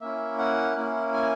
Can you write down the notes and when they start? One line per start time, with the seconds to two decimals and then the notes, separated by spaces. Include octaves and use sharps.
0.01 A#3 C#4 E4 E5
0.39 F#5
0.77 A#3 C#4 E4
1.13 G#5